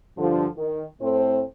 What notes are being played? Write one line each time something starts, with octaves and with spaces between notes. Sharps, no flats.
G2 D3 F3
D#3
A2 A3 C4 A4 C5